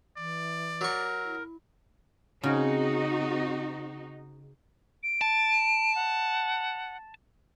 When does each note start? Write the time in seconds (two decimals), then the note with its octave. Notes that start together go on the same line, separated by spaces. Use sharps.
0.17 E3 D5
0.81 F#3 A#4 C#6
1.23 E4
2.43 C#3 C4 D#4 F#4
5.03 D7
5.21 A5
5.95 F#5